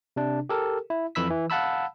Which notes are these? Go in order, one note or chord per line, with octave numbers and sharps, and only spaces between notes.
C3 D4
G4 A4 A#4
E4
F2 E3 B5 E6 B6
E3
F5 F#5 A5 B5 E6